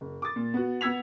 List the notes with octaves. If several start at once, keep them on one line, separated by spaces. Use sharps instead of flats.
F#1
D6 D#6 A6
A#2
B3 F#4
B3 F#5 E6 G#6 B6 F7